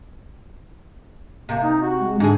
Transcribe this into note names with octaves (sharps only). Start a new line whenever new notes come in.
C3 A#3
D#4
F#4
G#3
G#2 D3 D4 G#4